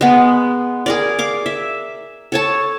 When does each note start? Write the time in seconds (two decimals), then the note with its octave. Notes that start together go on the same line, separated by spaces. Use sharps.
0.01 G#3 B3
0.86 G#4 A#4 D5
1.19 F5 D6
1.46 E5
2.32 A4 C#5 A5